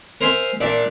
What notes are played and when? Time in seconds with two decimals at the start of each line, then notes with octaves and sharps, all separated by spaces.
0.21 A#4 C5 E5 G#5
0.61 A#2 D4 E5